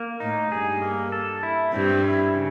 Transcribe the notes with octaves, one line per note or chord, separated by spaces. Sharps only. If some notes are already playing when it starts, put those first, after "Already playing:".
Already playing: A#3
A2 D#4
G2 G#4
A#3
A4
E4
G2 C4
E4
C#3